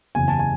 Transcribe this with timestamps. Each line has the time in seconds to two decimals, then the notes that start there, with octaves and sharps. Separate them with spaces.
0.15 F#1 E2 C#3 G#5
0.28 A5
0.39 G#5